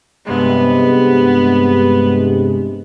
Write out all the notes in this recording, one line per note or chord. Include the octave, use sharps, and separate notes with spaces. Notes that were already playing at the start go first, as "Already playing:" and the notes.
G2 C3 G#3 B3